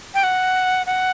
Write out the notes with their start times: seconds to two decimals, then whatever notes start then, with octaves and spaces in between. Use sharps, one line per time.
0.14 G5
0.23 F#5
0.87 F#5